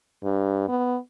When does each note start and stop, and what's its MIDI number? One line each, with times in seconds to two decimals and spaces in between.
0.24 0.64 43
0.69 0.97 59